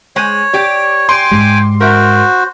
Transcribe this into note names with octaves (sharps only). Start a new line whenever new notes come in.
G#3 C5 C#5 G#5
G4 D5
G5 G#5 C6 D6
G#2 G#3 G4
F#4 A#4 C5 E5